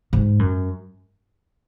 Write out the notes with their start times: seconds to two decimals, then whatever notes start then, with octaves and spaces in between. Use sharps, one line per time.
0.13 G#2
0.39 F#2